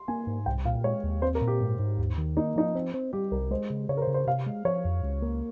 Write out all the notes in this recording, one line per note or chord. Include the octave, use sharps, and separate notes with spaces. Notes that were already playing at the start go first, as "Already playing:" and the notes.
Already playing: C6
A#3 G#5
G#2
C2 G5
A#2 F5
G#3 C#5
D#2
C4 C5
A#4
A#2
G4
G#2
G#2
D#2
D#3
A#3 D#4
F3 D#4
C4
C4
G3 G4
C2 A#4
G#3 C5
C#3
C#3 C#5
A#4
C5
C#3
C5
C3 F5
G#3
F3 C#5
F2
C#2
A#3